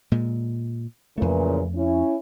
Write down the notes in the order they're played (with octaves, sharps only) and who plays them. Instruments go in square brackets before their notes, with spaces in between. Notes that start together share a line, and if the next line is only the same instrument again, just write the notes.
[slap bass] A#2 G#3
[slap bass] F2 A3 [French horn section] A#2 C#3 E3
[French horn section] C#4 E4